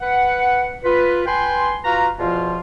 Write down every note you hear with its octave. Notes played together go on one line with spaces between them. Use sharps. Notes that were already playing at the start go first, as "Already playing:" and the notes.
B4 F#5
F4 B4
B4 G5 G#5 C6
F4 F#4 B4 F5 A#5
E2 B2 F3 F4